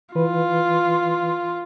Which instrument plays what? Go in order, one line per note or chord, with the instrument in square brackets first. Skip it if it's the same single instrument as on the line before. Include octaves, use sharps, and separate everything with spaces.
[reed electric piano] E3 B4 [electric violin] F4